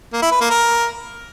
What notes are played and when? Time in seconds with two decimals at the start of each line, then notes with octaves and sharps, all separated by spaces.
0.13 A#3
0.22 E4
0.32 B4
0.41 A#3
0.50 A#4